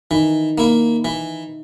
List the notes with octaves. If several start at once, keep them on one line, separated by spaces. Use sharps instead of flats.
D#3 E3 D#4
A#3 E4
E3